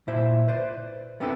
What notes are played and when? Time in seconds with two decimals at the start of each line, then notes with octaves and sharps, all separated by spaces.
0.08 A#2 E4 C5 E5
0.48 B4 C5 D5
1.20 B3 C4 D4 E4 A4 B4